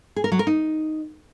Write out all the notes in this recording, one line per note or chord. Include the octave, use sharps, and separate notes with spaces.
G#4
A#4
F#3
A#4
D#4